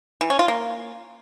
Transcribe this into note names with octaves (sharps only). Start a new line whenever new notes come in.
E3
C#4
F4
A#3